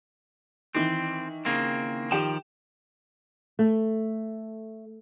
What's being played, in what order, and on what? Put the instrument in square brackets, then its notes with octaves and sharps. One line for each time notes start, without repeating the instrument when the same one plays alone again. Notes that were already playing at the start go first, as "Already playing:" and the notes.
[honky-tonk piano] D#3 E3 [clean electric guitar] C4
[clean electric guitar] C#3 A#3 C4
[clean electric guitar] D#3 F3 [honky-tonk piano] G4 G5 E7
[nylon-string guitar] A3